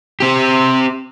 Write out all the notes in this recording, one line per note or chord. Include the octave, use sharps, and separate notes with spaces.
C4 G4